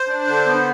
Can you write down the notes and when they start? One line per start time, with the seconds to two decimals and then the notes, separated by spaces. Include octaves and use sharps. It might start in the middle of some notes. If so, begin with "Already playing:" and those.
Already playing: C5
0.08 D4
0.27 D3
0.47 B3